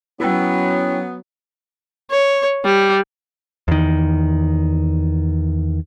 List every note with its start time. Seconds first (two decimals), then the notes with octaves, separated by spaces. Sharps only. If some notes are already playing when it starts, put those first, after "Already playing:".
0.20 F#3 B3 C#4 E4 G5
2.10 C#5
2.64 G3
3.68 E2 D#3